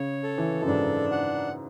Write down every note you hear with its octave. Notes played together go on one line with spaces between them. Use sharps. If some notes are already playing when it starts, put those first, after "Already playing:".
Already playing: C#3 C#5
A4
E3
F#2
G#2 D4
F#5